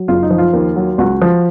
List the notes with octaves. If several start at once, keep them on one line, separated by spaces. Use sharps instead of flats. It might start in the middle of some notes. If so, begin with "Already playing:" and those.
Already playing: F#3
F#1 F4
D#4
F3
F4
D#2
F#3
C#2 F#4
F3